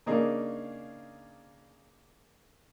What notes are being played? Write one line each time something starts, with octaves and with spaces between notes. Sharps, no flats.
C#3 A#3 D4 D#4 G#4